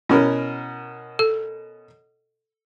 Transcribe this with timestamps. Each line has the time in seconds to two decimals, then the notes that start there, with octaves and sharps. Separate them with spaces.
0.09 B2 C#4 E4 A#4
1.19 A4